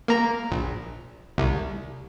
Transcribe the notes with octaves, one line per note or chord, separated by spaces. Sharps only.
A#3 A#5
A#1
C2